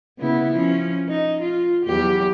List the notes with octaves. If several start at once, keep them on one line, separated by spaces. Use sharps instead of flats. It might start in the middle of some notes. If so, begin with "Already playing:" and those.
C#3 B3 E4
F3 C#4
D#4
F4
E2 F#3 G4